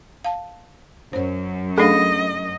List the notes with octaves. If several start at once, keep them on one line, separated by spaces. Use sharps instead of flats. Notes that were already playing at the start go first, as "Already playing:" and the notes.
F5 A5
F#2 C5 C#5
A3 D4 G#4 A4 D#5 F5 B5